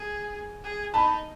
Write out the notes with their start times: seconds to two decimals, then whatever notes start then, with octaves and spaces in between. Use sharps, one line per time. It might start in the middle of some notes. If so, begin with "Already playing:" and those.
Already playing: G#4
0.64 G#4
0.94 D#4 A5 B5